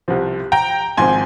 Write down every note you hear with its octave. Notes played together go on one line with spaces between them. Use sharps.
C2 C3 F3 C4
G5 A#5
G#1 G#2 F3 C4 G#5 C6